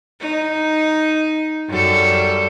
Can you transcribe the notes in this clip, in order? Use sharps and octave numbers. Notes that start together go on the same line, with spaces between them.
D#4
F#2 G3 A4